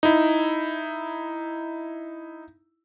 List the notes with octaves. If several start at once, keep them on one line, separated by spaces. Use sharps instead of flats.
D#4 E4